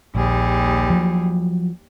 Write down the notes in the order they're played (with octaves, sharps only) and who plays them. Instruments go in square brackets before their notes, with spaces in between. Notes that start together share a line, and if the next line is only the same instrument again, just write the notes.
[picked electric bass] A#1 [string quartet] D#2 G3 G#4
[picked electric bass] F3 F#3